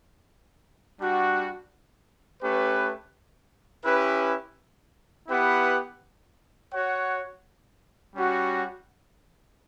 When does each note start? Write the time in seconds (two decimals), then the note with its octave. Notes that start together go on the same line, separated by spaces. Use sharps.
1.00 G3 D4 F#4
2.42 A3 C#4 G4 B4
3.85 C#4 E4 G4 B4
5.28 B3 E4 G4 B4 F#5
6.71 F#4 C#5 F#5
8.15 G3 C#4 F#4